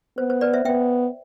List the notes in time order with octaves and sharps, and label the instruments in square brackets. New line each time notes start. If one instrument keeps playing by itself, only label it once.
[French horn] B3 [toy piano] C5
[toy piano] C5
B4 D5
C5 E5
[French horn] B3 [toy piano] E5 G5